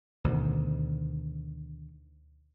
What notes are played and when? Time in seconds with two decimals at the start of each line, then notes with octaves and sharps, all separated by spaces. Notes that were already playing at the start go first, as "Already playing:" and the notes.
0.24 D2 B2 D#3